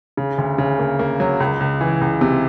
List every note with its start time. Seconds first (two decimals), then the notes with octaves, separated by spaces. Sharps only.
0.17 C#3
0.38 D2
0.58 C#3
0.79 A#3
0.99 A#3
1.20 F#3
1.40 C#2
1.60 C#2
1.81 E3
2.01 C#2
2.21 C3